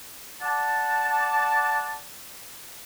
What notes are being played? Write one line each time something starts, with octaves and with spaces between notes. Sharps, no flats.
D5 F#5 A5